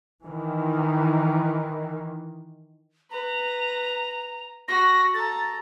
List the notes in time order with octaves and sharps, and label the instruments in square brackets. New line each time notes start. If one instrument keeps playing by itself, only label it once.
[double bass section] D#3 E3
[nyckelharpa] B4 [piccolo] A#5
[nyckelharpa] F#4 [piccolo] A#6
[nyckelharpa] A4 A#5 [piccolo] A6